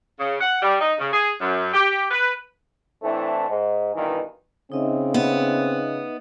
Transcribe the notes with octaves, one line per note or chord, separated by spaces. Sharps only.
C#3
F#5
G3
D#4
C#3
G#4
F#2
G4
B4
A2 E3 A3 C4 D4
G#2
G2 B2 D#3 E3
C#3 C4 D#4 D#5 E5
B3